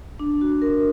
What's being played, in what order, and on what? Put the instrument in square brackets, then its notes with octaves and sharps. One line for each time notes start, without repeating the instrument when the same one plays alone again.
[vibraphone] D4
F#4
A#4